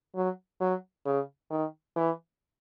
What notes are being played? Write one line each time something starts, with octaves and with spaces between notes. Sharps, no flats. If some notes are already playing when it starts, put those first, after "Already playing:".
F#3
F#3
C#3
D#3
E3